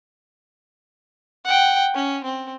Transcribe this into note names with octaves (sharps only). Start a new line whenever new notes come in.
F#5 G5
C#4
C4